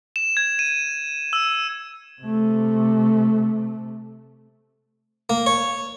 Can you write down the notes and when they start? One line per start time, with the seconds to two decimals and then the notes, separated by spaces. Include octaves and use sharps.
0.16 E7
0.37 G#6
0.59 D#7
1.33 E6
2.22 C3 A3
5.30 A#3
5.46 C#5